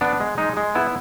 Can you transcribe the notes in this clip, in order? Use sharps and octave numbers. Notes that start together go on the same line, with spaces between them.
B3 D4
G#3
G#3 D#4
G#3
B3 E4